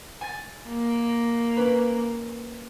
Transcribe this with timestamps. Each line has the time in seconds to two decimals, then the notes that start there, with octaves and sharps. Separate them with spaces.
0.21 G#5 A6
0.67 A#3
1.57 C#4 B4